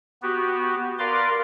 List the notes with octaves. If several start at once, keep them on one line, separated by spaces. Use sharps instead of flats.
B3 F#4 G4
A#4 B4 D5 F5 C6 D6